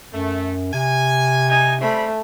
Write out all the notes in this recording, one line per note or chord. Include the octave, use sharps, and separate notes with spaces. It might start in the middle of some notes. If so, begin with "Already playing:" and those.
F#2 A3
C3 G#5
D#4 G#5
G3 A3 C4 B5